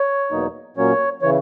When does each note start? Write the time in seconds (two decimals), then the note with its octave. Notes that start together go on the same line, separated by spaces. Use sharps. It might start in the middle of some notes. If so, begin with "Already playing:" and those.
Already playing: C#5
0.31 E2 B2 F#3 A#3 D#4
0.77 A#2 F#3 A#3 C#4 C#5
1.22 C#3 E3 C#5